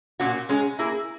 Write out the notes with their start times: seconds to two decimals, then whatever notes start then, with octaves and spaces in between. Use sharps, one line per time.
0.20 A#2 A#3 C#4 F#4
0.49 G#3 C#4 G#4
0.79 A#3 E4 G#4